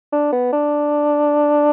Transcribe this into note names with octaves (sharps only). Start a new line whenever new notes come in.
D4
B3
D4